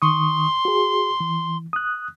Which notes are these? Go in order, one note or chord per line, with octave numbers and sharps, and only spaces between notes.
D#3 C6 C#6 D#6
F#4 G#4
E3
D#6 F#6